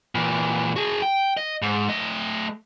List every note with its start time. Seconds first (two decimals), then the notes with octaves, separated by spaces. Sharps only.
0.15 A#2 E3
0.76 F#4 G#4
1.02 G5
1.37 D#5
1.62 G#2
1.88 A3 D#5